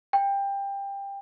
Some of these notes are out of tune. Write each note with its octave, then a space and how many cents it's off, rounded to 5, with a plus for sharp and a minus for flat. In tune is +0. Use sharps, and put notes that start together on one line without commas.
G5 +20